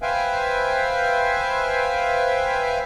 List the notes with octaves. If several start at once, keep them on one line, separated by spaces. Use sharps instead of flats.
B4 C5 E5 F5 G5 G#5